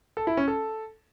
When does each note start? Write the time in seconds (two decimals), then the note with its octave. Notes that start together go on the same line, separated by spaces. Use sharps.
0.17 A4
0.27 E4
0.37 C#4
0.48 A4